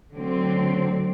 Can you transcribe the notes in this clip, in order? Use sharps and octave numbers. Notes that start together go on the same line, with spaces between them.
D3 F#3 A3 C4